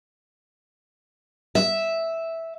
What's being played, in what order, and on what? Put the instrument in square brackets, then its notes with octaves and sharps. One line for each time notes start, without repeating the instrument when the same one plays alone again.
[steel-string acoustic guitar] E5